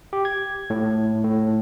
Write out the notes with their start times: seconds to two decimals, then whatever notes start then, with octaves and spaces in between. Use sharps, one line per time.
0.13 G4
0.25 G#6
0.70 A2
1.24 A2